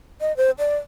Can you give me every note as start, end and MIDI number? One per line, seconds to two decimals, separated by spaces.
0.21 0.35 75
0.37 0.51 72
0.59 0.76 74